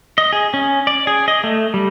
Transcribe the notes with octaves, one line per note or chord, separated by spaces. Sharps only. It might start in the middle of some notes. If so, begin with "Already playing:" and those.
D#5
G#4
C#4
D5
G#4
D#5
A3
G3